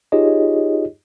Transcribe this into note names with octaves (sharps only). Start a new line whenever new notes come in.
D#4 F4 G4 G#4 C#5 D#5